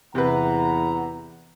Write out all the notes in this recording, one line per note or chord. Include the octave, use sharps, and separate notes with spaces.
E2 C3 B4 F#5 A#5